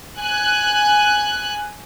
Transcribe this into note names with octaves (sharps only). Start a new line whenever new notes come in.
G#5 F#6